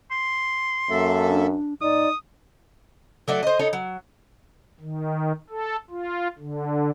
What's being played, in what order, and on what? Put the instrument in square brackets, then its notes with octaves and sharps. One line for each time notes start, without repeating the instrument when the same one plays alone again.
[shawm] C6
[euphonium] F#2 [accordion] A#3 A4 E5
[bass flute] D4
[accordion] A#2 [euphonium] D#4 [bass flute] D5 [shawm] D#6
[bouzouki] F#3 A3 D5
C5 D#5
D#4 A4 C#5
F#3
[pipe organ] D#3
A4
F4
D3